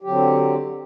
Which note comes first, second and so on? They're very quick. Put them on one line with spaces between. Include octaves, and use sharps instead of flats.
G4 F#3 D3 C4